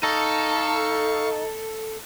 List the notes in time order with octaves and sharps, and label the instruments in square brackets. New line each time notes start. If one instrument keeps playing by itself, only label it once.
[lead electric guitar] D#4 [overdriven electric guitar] A4 [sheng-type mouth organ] F5 C#6